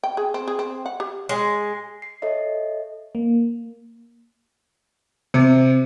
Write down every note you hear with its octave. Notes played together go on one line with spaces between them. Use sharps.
G5
G#4
C4
G#4
C4
F#5
G4
G#3
C7
A4 C#5 D#5 E5
A#3
C3